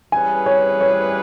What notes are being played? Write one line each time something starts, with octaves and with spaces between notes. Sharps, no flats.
E3 G3 C#4 G#4 B4 G#5
C#5
C#5